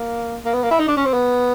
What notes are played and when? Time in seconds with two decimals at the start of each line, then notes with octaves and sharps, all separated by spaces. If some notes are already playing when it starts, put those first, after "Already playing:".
Already playing: A#3
0.45 A#3
0.54 B3
0.63 A#3
0.71 E4
0.79 D#4
0.88 D4
0.97 C#4
1.06 C4
1.13 B3